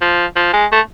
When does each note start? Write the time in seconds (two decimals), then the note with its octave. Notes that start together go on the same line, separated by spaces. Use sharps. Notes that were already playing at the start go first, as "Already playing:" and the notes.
0.01 F3
0.36 F3
0.53 G#3
0.72 A3